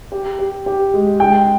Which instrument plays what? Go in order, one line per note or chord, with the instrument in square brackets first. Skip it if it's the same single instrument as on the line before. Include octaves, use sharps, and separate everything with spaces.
[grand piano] G4
G4
G4
G#3
[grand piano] G#3 [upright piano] G5